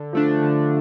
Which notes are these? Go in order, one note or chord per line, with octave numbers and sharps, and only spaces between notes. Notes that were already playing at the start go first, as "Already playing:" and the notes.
Already playing: D3
F3 A3 D4
D3